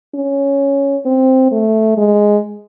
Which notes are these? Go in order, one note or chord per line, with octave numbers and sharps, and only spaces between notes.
C#4
C4
A3
G#3